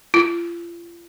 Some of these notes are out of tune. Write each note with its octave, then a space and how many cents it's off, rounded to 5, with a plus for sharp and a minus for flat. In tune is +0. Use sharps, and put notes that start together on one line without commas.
F4 -40